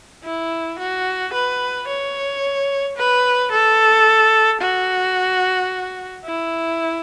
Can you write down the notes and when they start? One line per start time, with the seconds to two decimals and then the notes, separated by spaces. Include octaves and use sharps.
0.24 E4
0.79 F#4
1.33 B4
1.87 C#5
2.97 B4
3.52 A4
4.61 F#4
6.24 E4